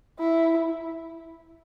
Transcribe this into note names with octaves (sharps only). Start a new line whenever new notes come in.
E4